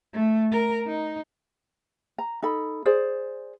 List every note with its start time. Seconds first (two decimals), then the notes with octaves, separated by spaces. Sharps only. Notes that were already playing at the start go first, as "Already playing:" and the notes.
0.14 A3
0.52 A#4
0.87 D#4
2.18 A#5
2.42 D#4 A4 B5
2.85 G#4 C5 D5